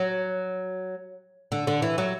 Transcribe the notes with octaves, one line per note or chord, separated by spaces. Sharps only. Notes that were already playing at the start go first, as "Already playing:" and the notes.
Already playing: F#3
D3
D3
E3
F#3